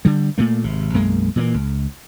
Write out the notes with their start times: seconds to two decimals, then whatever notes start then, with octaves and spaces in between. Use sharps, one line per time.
0.05 D3 G3
0.38 A#2 A3 A#3
0.64 G#1 C3
0.94 B1 F#2 G#3 A#3
1.36 A#2 E3 A3 A#3
1.54 C#2